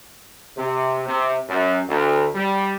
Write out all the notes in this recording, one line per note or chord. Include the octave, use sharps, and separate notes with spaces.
C3
C3
F#2
D2
G3